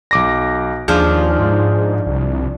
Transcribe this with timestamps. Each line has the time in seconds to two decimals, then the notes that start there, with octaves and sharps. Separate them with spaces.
0.11 B1 D6 A#6
0.88 D#2 F3 D4 F4 G#4
1.39 G#2
2.07 C2